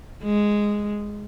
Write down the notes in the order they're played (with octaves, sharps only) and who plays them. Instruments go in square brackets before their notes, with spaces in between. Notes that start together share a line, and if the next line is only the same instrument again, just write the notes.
[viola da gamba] G#3